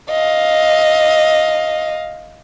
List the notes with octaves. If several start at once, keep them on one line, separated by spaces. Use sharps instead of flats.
D#5 F5